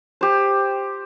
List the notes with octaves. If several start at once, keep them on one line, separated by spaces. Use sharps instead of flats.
G4 C5